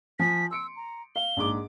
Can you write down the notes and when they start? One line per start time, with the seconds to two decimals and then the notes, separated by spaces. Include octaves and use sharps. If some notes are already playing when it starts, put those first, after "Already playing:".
0.19 F3 G#5 B6
0.51 C6 E6 C#7 D7
0.76 A#5
1.16 F5 G7
1.37 A#1 G#2 D6